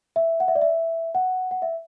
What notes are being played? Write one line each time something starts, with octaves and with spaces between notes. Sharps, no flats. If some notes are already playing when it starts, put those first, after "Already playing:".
E5
F#5
E5
D5
E5
F#5
F#5
E5